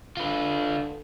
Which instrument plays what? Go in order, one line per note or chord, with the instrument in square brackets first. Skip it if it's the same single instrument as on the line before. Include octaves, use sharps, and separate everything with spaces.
[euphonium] D3 [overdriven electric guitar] F4 B4